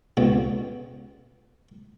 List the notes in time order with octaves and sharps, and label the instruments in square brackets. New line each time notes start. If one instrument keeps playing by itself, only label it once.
[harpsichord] C#2 B2